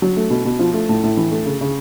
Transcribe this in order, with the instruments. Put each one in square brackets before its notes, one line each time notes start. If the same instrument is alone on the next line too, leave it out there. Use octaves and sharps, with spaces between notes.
[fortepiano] F#3
A3
B2
B2
F3
A3
A2
A2
E3
A3
C#3
C#3